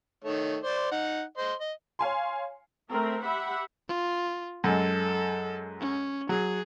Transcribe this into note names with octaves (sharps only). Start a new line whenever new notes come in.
D#3 A3 C#5
C5 D5
D#4 F#5
C5 D#5 C6
D#5
C#5 F5 G#5 C6
A3 C4 A#4 E5
G4 E5 F#5 B5
F4
F#2 G#3 A4
C#4
F#3 G#4